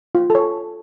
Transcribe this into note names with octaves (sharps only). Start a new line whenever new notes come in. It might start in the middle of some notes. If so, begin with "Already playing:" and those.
F4
A4
C#5